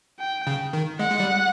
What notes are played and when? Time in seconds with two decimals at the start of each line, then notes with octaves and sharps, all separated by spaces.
0.20 G5
0.47 C#3
0.73 D#3
0.99 G#3 F#5
1.12 G#3
1.20 G3